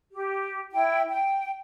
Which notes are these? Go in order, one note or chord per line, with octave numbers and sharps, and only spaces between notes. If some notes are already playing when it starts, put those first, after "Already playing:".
G4
E4 G5
G5